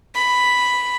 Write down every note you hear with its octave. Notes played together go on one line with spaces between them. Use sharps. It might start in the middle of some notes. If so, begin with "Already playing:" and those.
B5